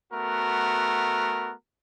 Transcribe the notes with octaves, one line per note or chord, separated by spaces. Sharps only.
A3 B3 F#4 A#4